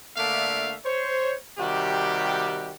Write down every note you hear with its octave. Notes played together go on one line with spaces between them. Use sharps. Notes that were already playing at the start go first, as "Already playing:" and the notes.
D3 A3 A#3 D4 E5 F5
C5 C#5
C3 D#3 G3 F#4 G4